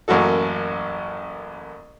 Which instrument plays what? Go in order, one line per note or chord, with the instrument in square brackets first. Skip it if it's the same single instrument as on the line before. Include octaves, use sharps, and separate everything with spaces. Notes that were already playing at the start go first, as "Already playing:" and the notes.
[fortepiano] A1 F#2 A#3 F#4 A4